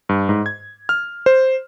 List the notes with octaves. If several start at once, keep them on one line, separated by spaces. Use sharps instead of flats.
G2
G#2
G#6
F6
C5